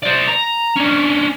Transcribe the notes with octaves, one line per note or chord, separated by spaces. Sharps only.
C5 D5
A#5
C#4 D4